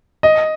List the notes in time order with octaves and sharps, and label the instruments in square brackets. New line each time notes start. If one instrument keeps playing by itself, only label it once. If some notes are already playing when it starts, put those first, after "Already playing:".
[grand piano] D#5